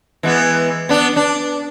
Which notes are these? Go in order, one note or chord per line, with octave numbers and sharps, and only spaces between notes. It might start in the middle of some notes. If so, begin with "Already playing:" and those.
E3 G#3 B3
B3 D4
D4